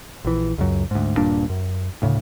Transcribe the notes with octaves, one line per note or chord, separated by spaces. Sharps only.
A#1 E3
C#2 F#2
D2 G#2
D#1 G2 A#2 D4
F#2
D2 A2 C#3